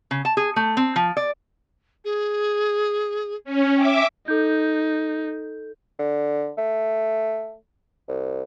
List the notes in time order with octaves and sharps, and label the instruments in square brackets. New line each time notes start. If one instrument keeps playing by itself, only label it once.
[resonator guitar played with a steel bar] C#3
A5
G#4
A3
C4
F3
D5
[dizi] G#4
[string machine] C#4
[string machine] E5 D6 [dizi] G5
[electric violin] D#4 [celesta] A4 G6
[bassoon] D3
A3
C2